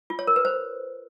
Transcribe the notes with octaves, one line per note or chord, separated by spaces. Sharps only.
F4
C#5
A#4
B4
C5